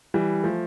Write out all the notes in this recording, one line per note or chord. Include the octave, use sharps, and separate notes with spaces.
E3 G3
F3 A3